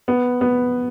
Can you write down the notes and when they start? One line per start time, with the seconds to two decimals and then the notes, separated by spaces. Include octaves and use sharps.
0.08 B3
0.41 B3